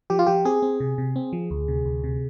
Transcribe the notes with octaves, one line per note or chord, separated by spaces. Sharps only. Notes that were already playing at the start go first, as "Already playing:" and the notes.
F3 G4
F4
F3 G4
C4 G#4
C4
C3
C3
C4
F3
D2
C3
D2
C3